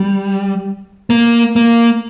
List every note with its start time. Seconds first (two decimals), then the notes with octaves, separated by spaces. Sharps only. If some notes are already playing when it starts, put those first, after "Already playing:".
Already playing: G3
1.10 A#3
1.56 A#3